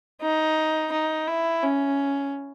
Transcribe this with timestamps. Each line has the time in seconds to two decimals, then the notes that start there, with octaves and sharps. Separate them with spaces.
0.22 D#4
0.92 D#4
1.28 E4
1.63 C#4